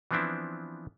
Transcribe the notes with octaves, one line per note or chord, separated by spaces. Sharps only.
E3 F3 B3 C4 D4 E4